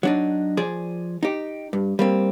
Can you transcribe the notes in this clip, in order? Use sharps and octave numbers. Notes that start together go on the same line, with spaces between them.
F#3 D4 D#4
F3 G#4 D5
D#4 G4
G2
G3 A#3 C4